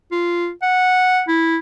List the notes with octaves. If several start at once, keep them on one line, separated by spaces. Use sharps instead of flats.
F4
F#5
E4